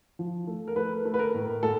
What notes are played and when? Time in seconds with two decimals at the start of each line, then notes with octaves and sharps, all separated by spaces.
0.19 F3
0.47 A3
0.67 A#4
0.76 A3 B4
1.05 A3
1.14 B4
1.19 A#4
1.34 A2
1.63 A2 A4